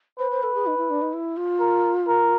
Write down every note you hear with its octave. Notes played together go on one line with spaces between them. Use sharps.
B4 C5
C5
A4
G#4
D#4
E4
D4
D#4
E4
F4
A#4
A#4